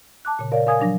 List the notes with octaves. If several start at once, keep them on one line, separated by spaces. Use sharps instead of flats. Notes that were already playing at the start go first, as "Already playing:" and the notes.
A5 D6 F#6
A#2 C#3
A#4 C#5 D5 F5
A#4 F5 G#5 D#6 G#6
F3 F#3 D4 A#6